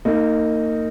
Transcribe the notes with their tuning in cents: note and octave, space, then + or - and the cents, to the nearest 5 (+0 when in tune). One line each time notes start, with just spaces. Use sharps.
A#3 -30 D#4 +0